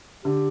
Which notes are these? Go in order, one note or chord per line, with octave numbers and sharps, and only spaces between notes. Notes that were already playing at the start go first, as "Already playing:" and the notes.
D3 G4